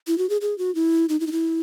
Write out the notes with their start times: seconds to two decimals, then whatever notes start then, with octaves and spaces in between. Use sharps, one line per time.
0.07 E4
0.18 F#4
0.30 G#4
0.41 G#4
0.58 F#4
0.75 E4
1.09 D#4
1.20 E4
1.27 D#4
1.32 E4